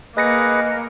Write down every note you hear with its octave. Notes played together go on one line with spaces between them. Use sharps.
A#3 G#4 B4 D#5 A#6 C#7